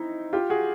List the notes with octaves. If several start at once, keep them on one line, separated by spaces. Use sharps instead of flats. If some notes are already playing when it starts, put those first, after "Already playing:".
Already playing: C4 D#4 E4
F4 G4
F#4 G#4